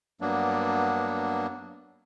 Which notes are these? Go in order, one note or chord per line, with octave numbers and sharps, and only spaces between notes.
G2 F#3 A#3 B3 D4